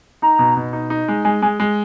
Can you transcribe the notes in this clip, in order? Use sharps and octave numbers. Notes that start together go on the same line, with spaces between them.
D#4 A#5
B2
B2
D#4
D#4
G#3
G#3 G#5
G#3 G#5
G#3